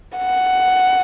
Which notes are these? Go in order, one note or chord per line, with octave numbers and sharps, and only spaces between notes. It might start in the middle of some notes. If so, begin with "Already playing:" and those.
F#5